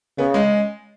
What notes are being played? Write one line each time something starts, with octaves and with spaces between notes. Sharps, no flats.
C#3 B3
G#3